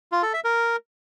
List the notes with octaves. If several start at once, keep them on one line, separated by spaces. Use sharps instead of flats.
F4
A4
E5
A#4